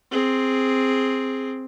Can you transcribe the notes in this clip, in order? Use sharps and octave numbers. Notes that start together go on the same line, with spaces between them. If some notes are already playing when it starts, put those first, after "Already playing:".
C4 G#4